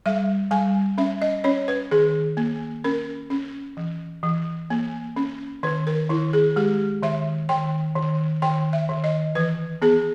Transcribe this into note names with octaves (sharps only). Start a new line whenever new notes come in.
G3 E5
G3 G#5
C#4 E5
D#5
C#4 C#5
B4
D#3 G#4
A#3
C#4 A#4
C#4
E3
E3
A#3
C#4
D#3 B4
A#4
D#3 E4
G#4
G#3 G4
D#3 E5
D#3 G5
D#3
D#3 G5
E5
D#3
D#5
E3 B4
B3 G#4